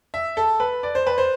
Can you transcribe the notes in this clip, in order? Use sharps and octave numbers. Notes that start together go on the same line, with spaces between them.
E5
A4
B4
D5
C5
B4
C5